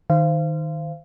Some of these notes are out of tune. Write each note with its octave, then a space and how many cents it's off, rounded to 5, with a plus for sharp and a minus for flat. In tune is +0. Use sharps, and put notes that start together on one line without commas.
D#3 +0 C5 -20 F5 -30